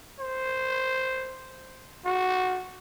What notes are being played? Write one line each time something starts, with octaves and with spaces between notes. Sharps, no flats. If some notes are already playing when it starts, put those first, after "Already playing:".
C5
F#4